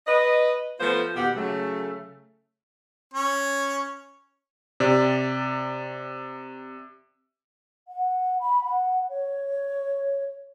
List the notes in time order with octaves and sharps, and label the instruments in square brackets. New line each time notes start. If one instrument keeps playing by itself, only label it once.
[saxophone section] B4 D#5
F3 A3 B3 F4 B4 C5
D#2 B2 B3 G4 F#5
C#3 F#3 A3
[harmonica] C#4 C#5
[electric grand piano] C3 D5
[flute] F#5
B5
F#5
C#5